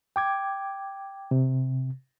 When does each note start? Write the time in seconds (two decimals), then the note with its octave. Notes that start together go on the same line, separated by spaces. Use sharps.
0.16 G5 D6 G#6
1.31 C3